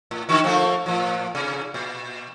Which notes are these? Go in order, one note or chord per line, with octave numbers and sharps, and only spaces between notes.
A2
D3 D#3 F#4
F3 A3 A#3
A2 F3
C3
A#2